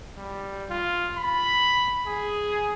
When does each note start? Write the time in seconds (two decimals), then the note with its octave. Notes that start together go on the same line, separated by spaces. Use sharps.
0.17 G3
0.70 F4
1.17 B5
2.07 G#4